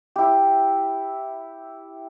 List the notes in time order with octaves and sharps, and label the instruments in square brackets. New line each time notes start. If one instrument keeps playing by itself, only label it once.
[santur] E4 G4